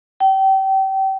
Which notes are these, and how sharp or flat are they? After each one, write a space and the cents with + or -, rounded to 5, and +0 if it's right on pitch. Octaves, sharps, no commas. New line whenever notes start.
G5 -30